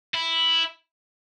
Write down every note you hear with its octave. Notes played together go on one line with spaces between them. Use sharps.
E4